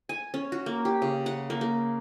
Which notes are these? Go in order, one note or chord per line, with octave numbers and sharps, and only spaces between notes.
G#5
C#4
F#4
A#3
G4
C#3
F#5
A#3
A#3